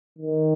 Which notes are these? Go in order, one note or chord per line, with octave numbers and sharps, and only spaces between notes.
D#3